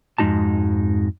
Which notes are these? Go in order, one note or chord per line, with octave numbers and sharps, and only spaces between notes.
F2 G#2 G#3 D#4 F#4 A5